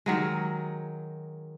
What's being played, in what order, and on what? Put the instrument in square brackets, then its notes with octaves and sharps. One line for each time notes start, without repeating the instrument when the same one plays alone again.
[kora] D#3 F#3 G#3